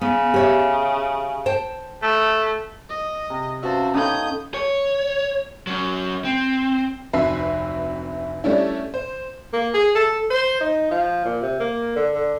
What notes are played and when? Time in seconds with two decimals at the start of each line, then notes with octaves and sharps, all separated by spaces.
0.01 C#3 B3
0.34 G4 C#5 E5
1.46 C5 G5 A5
2.03 A3
2.90 D#5
3.30 C3
3.62 C#4 F#4 B4 C5 E5 F5 A5
3.94 D#3 B3 C#4 A4 C#5 F5 D#6 G6
4.54 C#5
5.67 F#3 C#4
6.25 C4
7.13 F1 D2 C4 B4 E5 C7
8.44 G3 A3 C#4 D4 E4
8.94 C5
9.53 A#3
9.74 G#4
9.95 A4
10.30 C5
10.61 D#4
10.91 F3
11.25 A#2
11.42 C3
11.60 A#3
11.96 D3
12.14 D3